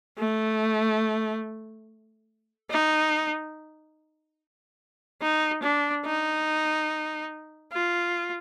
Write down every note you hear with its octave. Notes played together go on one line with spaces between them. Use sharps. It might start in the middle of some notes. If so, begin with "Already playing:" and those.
A3
D#4
D#4
D4
D#4
F4